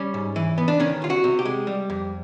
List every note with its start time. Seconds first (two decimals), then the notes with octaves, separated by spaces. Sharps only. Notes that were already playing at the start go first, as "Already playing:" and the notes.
Already playing: G3 C#4
0.14 G#2
0.36 E3
0.58 B3
0.68 D4
0.80 D#3 C#4
1.02 C2 F4
1.10 F#4
1.24 C3
1.39 G4
1.45 G#3
1.67 G3
1.90 F2